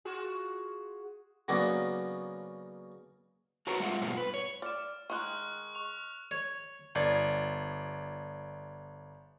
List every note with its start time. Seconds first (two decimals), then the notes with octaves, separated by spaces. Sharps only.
0.05 F4 F#4 G#4
1.48 C#3 F#3 A#3 B3 D4 D#4
3.67 F#4 A#4 B4 C#5 A5 A#5
3.80 G3 G#3 F4 E5 F#5
4.02 G#2 B2 G3 B3 F4
4.17 B4
4.34 C#5
4.62 D5 F6 E7
5.10 D#3 G#3 C#6 F#6
5.75 C#6 F7
6.31 C#5
6.95 G1 D5 G#6